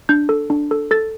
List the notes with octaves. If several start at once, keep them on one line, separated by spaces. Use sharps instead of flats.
D4 G6
A4
D4
A4
A4 A6